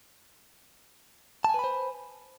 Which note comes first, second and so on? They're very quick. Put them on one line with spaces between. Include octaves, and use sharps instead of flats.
A5 G#5 B4 B5 C5